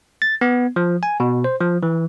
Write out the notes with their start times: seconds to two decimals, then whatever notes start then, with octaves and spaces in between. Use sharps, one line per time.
0.22 A6
0.41 B3
0.76 F3
1.03 G#5
1.20 B2
1.44 C5
1.61 F3
1.83 E3